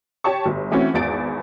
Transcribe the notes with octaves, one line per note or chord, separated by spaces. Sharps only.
G4 C#5 A5 C#6
G1
E3 A3 C4 C#4 F#4
G#1 E2 A6 D7